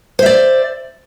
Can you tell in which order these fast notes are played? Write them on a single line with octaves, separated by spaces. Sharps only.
C5 E5 D5